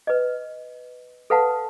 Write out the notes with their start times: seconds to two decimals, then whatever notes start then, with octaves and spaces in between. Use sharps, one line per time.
0.07 B4 D#5
1.30 A4 B4 F5 F#5 A5